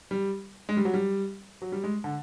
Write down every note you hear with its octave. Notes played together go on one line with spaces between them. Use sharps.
G3
G#3
G3
F#3
G3
F#3
G3
G#3
D3